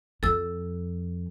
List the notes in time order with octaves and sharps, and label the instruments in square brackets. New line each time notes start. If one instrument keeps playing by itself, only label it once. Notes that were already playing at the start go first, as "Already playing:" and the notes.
[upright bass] F2 [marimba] A4 E6